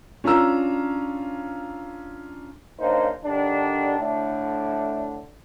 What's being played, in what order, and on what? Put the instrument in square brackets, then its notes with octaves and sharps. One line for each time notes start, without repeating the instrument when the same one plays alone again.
[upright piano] C#4 D4 F4 A#5 E6
[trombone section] F#2 C#3 A#3 D4 D#4 C5
D3 D#3 G3 D4
A2 D3 A3 D4